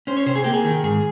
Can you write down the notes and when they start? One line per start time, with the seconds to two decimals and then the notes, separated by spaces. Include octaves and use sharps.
0.07 C#4 C5
0.17 C#5
0.26 C3 C5
0.35 G#4
0.44 A#3 G4
0.54 G#4
0.65 D#3
0.83 G#2 G#4